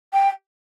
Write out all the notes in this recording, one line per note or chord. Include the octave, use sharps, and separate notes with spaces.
G5